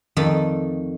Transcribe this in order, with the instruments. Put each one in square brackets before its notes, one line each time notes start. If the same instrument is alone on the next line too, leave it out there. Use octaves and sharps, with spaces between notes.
[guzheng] F2 D#3 A3 A4 D5 D#5